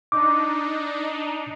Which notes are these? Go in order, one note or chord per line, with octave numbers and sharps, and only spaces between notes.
D4 D#4 D6